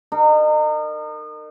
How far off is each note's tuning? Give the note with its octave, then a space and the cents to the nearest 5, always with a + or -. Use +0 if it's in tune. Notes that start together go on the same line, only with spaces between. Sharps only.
D#4 -35 A#4 -30